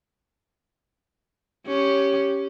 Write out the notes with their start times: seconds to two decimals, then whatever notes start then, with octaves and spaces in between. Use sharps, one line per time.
1.67 C#4 G4